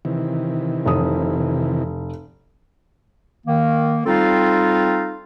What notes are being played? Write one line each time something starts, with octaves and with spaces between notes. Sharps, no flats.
C3 D#3 E3
F1 D#6
D#3 A#3
G3 C4 D#4 F4 A4 F5